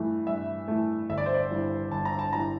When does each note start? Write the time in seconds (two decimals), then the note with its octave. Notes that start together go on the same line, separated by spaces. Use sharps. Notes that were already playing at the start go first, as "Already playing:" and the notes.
Already playing: G2 E3 A3
0.27 G2 E5
0.68 E3 A3
1.09 G1 E5
1.18 D5
1.26 C5
1.34 D5
1.51 G2 E3
1.91 G1 A5
2.05 A#5
2.19 A5
2.32 G2 E3 A#5